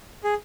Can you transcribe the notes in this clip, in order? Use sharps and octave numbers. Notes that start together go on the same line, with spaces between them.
G#4